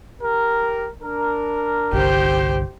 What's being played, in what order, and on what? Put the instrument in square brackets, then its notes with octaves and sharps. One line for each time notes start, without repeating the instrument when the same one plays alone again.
[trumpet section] G4 A#4
D4 A#4
[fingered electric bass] G1 C2 D3 [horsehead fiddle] G4 C5